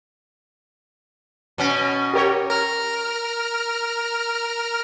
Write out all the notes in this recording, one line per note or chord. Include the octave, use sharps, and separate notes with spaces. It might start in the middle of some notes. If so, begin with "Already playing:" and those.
B2 C#4
G4 A#4 C#5
A#4 F6